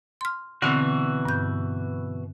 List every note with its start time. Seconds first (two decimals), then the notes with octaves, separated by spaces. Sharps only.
0.21 C6 F6
0.62 B2 D3 E3 C4 F#4
1.25 G2 G6